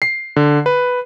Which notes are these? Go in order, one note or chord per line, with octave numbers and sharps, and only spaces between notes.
C7
D3
B4